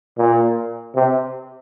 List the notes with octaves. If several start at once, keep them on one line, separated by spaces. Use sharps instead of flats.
A#2
C3